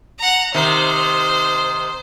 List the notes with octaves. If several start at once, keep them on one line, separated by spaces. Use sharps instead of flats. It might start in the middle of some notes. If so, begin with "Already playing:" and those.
F#5 A#5
C3 D#3 C5